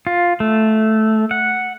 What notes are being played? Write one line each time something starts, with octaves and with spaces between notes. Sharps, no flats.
F4
A3
F#5